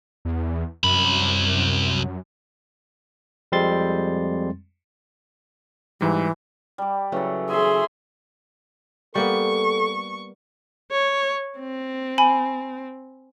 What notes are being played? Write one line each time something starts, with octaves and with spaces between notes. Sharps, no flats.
E2
C2 F#2 B5
F2 G3 G#3 C4 C6 A6
G#2 E3 G3
G3 D6
C#3 E3 F#3 A4
G#4 E5 C6
G3 A#3 B3 A4 C#6
C#5
C4
G#5 B5